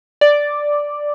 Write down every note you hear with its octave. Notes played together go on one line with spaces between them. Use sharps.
D5